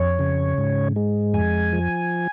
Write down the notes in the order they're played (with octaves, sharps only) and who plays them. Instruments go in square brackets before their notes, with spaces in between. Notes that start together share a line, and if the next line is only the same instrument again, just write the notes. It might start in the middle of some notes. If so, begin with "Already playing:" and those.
Already playing: [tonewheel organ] F2 C#5
C#3
G#2
G#3
F2 G#5
F3